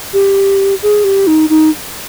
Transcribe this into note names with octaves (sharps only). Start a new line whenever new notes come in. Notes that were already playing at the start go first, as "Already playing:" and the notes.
G4
G#4
G4
D#4
D#4